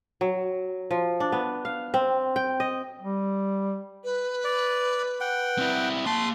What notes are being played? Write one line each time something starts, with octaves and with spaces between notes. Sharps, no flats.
F#3
F3
D4
B3
F5
C4
G5
D#5
G3
B4
D5
F#5 G5
C4 E4
A#3 A5 C6